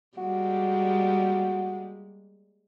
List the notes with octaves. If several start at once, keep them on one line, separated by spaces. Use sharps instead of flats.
G3 G#3 A#3 F#4